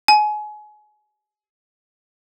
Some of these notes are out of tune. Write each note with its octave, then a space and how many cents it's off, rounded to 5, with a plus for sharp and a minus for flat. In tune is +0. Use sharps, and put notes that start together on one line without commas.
G#5 +30